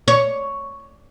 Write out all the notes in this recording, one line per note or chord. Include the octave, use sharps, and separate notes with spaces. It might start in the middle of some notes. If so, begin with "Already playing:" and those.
C#5